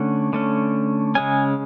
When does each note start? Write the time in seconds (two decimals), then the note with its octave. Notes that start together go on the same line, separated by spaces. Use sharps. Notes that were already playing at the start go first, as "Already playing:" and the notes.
Already playing: D3 A3 C#4 F#5
0.33 D3 A3 C#4
1.15 C#3 G#3 C#4 G#5